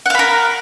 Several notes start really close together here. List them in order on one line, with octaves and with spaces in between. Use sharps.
F#5 F5 B5 A#4